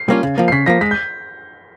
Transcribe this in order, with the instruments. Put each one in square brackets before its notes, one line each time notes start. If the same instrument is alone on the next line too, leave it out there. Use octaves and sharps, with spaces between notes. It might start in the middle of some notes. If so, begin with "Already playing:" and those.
Already playing: [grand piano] C7
[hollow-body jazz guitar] G3 A#3 C#4 F4
C#3
F3 A#3
[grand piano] C7
[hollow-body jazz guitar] C#3 [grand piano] B6
[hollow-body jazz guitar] F3 A#3 [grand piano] A#6
[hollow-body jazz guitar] G#3 [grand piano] B6
[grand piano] G6